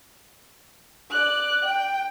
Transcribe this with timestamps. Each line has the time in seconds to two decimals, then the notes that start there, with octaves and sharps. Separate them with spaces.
1.10 D5 F#6
1.65 G5